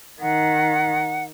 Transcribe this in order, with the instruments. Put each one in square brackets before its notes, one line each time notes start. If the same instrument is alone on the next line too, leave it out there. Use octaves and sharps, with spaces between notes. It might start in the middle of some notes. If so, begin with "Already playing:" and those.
[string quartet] D#3 [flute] F#5